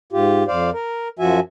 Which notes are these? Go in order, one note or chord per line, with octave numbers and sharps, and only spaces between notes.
G#2 F4 G4
F2 C5 D5 F5
A#4
F#2 F3 F#4 E5 G#5